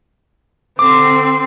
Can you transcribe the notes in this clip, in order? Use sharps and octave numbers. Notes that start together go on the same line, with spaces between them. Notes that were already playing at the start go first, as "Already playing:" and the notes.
D3 C4 C6 D6